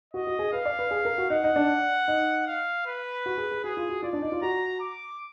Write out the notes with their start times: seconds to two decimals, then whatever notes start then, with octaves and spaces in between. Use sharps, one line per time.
0.13 F#4 D#5
0.27 F#4
0.39 G#4
0.53 B4 F5
0.65 D5
0.79 B4
0.91 G#4
1.05 A#4
1.18 F#4
1.30 D#4 F#5
1.44 D#4
1.56 D4
2.08 D#4
2.47 F5
2.86 B4
3.26 F#4
3.38 G#4
3.51 G#4
3.64 F#4 G#4
3.77 F4
3.89 F#4
4.03 F4 D5
4.13 D4
4.22 D#4
4.32 F4
4.42 F#4 A#5
4.80 D6